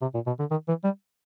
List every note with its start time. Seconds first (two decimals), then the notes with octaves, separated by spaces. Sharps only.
0.02 C3
0.15 A#2
0.27 B2
0.40 D3
0.51 D#3
0.68 E3
0.84 G3